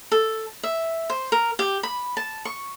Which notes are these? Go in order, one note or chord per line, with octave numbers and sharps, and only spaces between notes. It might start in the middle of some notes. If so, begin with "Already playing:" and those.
A4
E5
C5
A#4
G4
B5
A5
C#6